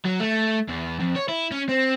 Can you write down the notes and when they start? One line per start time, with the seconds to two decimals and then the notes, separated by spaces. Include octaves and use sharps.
0.05 F#3
0.20 A3
0.69 E2
1.00 F2
1.16 C#5
1.29 E4
1.51 C#4
1.69 C4